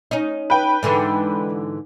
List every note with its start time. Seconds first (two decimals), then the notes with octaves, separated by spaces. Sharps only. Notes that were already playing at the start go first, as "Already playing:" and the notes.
0.11 C#4 D#4
0.50 B4 G5
0.83 G#2 D3 E3